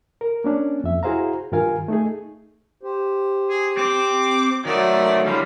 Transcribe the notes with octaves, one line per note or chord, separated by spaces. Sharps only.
A#4
A#3 C#4 D4
F2 E5
E4 F#4 G#4 C5 F5 A#5
G2 D#3 F4 A#4 F5 G#5
A3 D#4 G#4
G4 C5
G#4
C4 D6
D#3 F#3 A3 D#4 F#4 D5
D3 F#3 G3 E4 F5